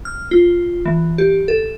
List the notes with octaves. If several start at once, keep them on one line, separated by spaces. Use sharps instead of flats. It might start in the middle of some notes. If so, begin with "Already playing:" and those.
F6
F4
E3
G4
A4